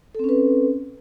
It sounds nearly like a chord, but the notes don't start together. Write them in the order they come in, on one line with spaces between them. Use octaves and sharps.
A4 C4 C#4 B4